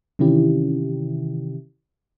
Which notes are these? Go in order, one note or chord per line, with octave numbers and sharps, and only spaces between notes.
C3 D#3 E3 C#4 E4 G4